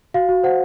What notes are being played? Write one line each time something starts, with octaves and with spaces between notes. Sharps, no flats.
F#4 F5
F#4
C5 F#5